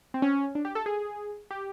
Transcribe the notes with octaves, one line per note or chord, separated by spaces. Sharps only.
C4
C#4
D4
G4
A4
G#4
G4